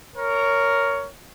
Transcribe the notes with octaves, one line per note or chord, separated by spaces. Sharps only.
A#4 C#5